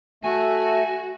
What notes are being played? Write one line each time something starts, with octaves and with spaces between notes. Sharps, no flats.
A3 F#4 G#5